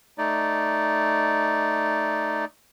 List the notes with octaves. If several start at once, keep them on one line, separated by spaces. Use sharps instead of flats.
A3 D#4 D5